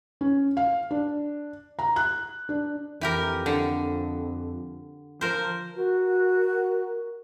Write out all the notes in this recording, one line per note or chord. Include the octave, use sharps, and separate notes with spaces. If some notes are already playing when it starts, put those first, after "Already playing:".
C#4
F5
D4
A#5
F#6
D4
F2 E3 G4 A#4
D3
F3 A#4 C5
F#4 A#4